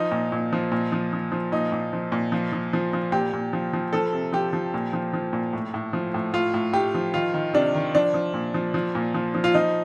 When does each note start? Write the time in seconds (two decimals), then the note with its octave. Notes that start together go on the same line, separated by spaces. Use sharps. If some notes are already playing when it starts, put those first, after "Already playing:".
Already playing: F3 D#4
0.11 A#2
0.32 A#2
0.53 F3
0.72 A#2
0.92 F3
1.13 F3
1.32 F3
1.52 A#2 D#4
1.72 A#2
1.93 F3
2.12 A#2
2.32 F3
2.52 F3
2.73 F3
2.93 F3
3.12 A#2 G4
3.33 A#2
3.53 F3
3.73 F3
3.93 F3 A4
4.13 C3
4.33 F3 G4
4.53 F3
4.74 A#2
4.93 F3
5.13 F3
5.33 A#2
5.53 A2
5.74 A2
5.93 F3
6.14 A2
6.33 A2 F4
6.54 A2
6.73 A2 G4
6.94 F3
7.14 D#3 F4
7.34 D#3
7.53 C3 D4
7.75 D#3
7.95 F3 D4
8.14 F3
8.34 A#2
8.54 F3
8.74 F3
8.95 A#2
9.14 F3
9.34 F3
9.44 F4
9.54 F3 D#4